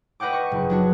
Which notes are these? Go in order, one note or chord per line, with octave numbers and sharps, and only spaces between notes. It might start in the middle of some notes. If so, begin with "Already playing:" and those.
B4 D#5 F#5 G5 D6
C#6
F#1
F#3 D4 F#4